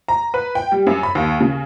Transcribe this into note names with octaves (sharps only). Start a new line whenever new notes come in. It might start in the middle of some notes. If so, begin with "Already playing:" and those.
A#5
B4
G5
G3
F#2
B5
D#2
C#3